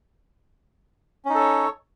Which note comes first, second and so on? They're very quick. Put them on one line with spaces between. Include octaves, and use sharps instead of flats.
C#4 D#4 A4 C#5